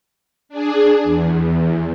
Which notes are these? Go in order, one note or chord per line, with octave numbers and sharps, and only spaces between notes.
D4 G#4
E2